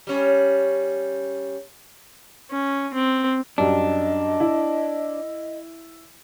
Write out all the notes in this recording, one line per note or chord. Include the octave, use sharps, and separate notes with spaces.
G3 C#4
C#4
C4
F#2 G3 D4 D#5
E4